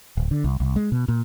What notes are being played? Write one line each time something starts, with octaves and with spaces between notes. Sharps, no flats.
D1
D3
C2
C2
G#3
B2
A#2